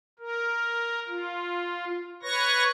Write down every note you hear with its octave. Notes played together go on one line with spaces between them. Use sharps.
A#4
F4
B4 C#5 C#6 A#6